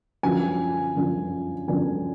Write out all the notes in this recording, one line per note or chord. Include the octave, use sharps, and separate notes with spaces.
F#2 D3 F3 G#5
F#2 D3 F3
F#2 D3 F3 G#5